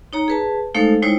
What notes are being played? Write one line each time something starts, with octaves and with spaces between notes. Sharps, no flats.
D#4 C#5 A#5
G#4 B4 A5
G#3 A3 D#4 A4 C5 F5
G3 G#3 D#4 E4 C5 C#5